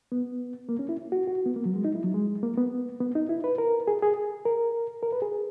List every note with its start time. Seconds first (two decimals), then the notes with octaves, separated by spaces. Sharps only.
0.12 B3
0.69 A#3
0.79 C#4
0.89 E4
1.12 F#4
1.27 F#4
1.46 B3
1.56 A#3
1.65 F#3
1.76 G#3
1.85 D#4
1.95 E4
2.04 F#3
2.14 G#3
2.43 A#3
2.57 B3
3.01 B3
3.15 D#4
3.29 E4
3.44 B4
3.58 A#4
3.88 G#4
4.02 G#4
4.45 A#4
5.03 A#4
5.13 B4
5.22 G#4